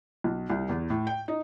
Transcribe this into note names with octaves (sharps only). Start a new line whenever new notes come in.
B1
C2
E2
A2
G5
D#4